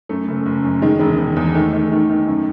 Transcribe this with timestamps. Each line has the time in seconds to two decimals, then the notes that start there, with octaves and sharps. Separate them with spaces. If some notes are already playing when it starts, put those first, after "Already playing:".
0.09 F#2 A3
0.28 F#1
0.46 F#1
0.64 F#2
0.82 D#3 G#3
0.99 E1 G#3
1.18 E1
1.36 E2
1.55 D#3 A3
1.73 D#3
1.91 D#3
2.09 D#3
2.27 F#2